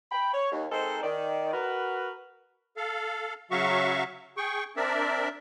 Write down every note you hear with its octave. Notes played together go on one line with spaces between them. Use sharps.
G5 B5
C#5
D#2
G#3 C4 D#4 A4 A#4 C5
D#3 D5
F#4 A#4 B4
A4 F5
C#3 F#3 F#4 E5 F5 C#6
G#4 G5 C#6
C4 D4 A#4 D5 E5